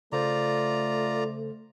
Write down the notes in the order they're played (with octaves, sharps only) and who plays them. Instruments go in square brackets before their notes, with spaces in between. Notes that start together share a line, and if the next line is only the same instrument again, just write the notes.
[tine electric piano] C#3 A4 C5 [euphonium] A3 [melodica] F4 D5 A#5